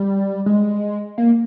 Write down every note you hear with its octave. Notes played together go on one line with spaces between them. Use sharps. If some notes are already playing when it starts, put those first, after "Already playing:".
Already playing: G3
G#3
A#3